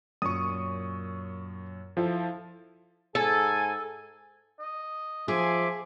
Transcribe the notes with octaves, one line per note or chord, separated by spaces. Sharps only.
F#2 A#2 C#4 C#6 D#6
F3 E4 F4 A4
G#2 G#4 A4 G#5
D#5
F3 G#4 E5 G#5 C6 D6